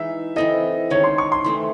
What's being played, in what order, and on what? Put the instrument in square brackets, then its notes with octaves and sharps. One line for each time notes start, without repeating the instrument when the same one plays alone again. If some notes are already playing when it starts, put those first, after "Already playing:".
Already playing: [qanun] E3 G#3 D#4 [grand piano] E5
[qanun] E3 C4 E4 A4 [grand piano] D#5
[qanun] D#3 G#3 C#4 [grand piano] C#5
[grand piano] C6
C#6
C6
[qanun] E3 A3 C4